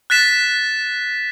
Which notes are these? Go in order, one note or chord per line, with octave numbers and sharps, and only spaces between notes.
F#6 A6 B6 E7